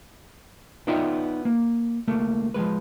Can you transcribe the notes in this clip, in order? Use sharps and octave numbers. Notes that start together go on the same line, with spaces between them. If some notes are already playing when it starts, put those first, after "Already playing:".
B3 D#4 F4 D5 E5 G5
A#3
C#2 A3 A#3
F3 F#3 G#3 B4